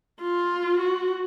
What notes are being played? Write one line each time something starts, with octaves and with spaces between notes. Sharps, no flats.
F4
F#4